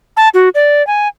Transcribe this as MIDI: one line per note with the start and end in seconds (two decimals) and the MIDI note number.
0.17 0.29 81
0.34 0.49 66
0.55 0.85 74
0.87 1.08 80